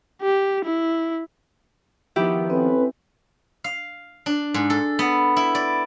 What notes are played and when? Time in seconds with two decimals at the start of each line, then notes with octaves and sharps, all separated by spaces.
0.22 G4
0.65 E4
2.16 D#3 F3 B3 E4 G4
2.50 C4 C#4 A4 B4
3.64 F5
4.26 D4
4.54 G#2
4.70 A4
4.99 B3
5.37 E4
5.55 D5